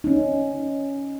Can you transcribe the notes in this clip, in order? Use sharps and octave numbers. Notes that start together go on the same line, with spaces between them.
C#4 D#4